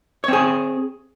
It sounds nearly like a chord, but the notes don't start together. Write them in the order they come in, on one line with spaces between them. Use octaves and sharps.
C#5 C4 G#4